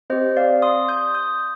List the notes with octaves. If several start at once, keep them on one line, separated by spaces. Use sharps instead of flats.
C4 G4 C5 D#5
D5 F5
C6 D#6
D#6 G6
D#6 G6